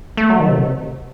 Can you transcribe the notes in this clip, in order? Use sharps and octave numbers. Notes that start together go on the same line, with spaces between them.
A3
F#3
D#3
C3